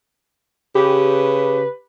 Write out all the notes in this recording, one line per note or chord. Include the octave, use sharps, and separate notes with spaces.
C#3 G4 B4